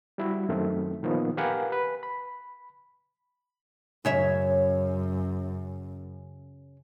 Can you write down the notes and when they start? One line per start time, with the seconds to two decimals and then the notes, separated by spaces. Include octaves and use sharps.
0.18 G3 E4 F#4
0.49 F#2 D#3 A3 C4
1.03 A#2 D#3 F3 B3
1.37 G4 A#4 B4 F5 F#5 G#5
1.72 B4
2.03 B5
4.05 F#2 C#3 C#5 E5